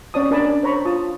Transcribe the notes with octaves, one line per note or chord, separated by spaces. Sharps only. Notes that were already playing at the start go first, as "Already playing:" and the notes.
C#4 C#5 D5 A5 D#6
D4 A#4 D5 G#5 A5 B5
C5 C#5 A#5 B5 C#6
F4 A5 D#6